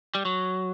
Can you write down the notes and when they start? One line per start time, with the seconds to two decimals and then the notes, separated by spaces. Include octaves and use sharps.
0.15 G3
0.25 F#3